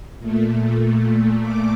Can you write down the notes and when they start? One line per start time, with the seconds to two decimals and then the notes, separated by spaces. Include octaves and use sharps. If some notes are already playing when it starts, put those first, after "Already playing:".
0.19 A#2 A3
1.40 D6